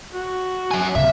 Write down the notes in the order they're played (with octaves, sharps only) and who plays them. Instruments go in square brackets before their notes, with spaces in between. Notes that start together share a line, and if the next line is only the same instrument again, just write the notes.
[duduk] F#4
[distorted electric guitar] F#3 G#5
[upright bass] D2 C3 [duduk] A#3 [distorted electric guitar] E5